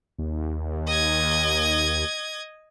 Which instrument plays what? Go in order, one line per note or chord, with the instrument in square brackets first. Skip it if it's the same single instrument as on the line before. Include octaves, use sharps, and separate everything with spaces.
[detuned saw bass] D#2
[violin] D#5 G#6